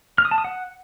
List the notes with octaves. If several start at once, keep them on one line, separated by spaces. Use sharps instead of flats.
F6
D#6
A5
D#6
F#5